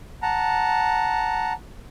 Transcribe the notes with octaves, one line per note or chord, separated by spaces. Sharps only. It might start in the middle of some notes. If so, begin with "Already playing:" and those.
F#5 A5 A#5